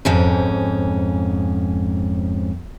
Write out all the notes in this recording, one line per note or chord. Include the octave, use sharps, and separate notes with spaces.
F2 G#2 C#4